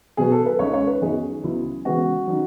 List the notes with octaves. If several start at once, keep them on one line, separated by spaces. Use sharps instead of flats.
B2 F#3 B3 G#4
A4
B4
C#2 C#3 G#3 D#4 C#5
C#5
B4
F#2 D#3 F#3 B3 D#4 G#4
C#2 C#3 F#3 B3 E4
C#3 E3 G#3 B3 F#4
D#3 F#3